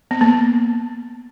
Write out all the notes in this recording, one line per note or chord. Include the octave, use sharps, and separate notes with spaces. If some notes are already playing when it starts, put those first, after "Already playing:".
B3
A#3